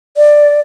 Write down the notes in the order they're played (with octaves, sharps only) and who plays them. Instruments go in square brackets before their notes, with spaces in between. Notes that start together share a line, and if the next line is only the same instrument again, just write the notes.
[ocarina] D5